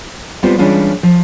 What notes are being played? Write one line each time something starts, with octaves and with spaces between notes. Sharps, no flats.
G3 G#3 B3 C4 F4 G4
E3 G3 G#3 C#4 D4 F4
F3